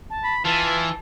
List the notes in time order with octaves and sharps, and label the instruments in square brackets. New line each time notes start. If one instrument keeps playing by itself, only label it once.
[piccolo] A5
[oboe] B5
[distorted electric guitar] E3 [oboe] F4 [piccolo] A5